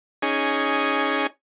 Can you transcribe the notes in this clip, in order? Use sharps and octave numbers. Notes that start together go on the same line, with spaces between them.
C#4 D#4 G#4